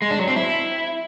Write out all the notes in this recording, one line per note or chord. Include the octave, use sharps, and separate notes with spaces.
G#3
D4
F#3
C4
E4